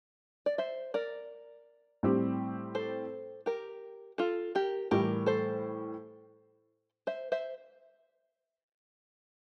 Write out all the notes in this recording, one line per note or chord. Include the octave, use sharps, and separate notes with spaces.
D5
C5 E5
A#4 D5
A2 G3 C4 G4
A4 C5
G4 A#4
F4 A4
G4 A#4
A2 E3 G3 G4 A#4
A4 C5
C5 E5
C5 E5